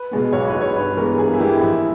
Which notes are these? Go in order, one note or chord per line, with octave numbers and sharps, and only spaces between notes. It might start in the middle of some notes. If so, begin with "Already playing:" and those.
Already playing: B4
B2 G#3 B3
B1 C#5
B4
B2 G#3 B3
C#5
G2 B4
E3 G#3 B3 A#4
G2 G#4
E4
E3 G#3 B3 G4
A#1 E4